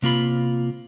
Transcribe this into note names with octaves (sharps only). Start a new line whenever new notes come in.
C3 A#3 F4 B5